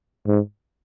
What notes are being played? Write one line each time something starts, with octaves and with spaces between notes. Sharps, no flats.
G#2